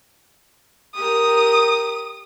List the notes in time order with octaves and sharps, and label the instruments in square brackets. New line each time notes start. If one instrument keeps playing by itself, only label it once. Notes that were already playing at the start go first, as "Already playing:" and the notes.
[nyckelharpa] G4 A#4 [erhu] D#6